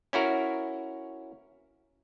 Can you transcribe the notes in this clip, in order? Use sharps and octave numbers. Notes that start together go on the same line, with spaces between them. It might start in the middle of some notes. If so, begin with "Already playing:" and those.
C#4 E4 F#4 A#4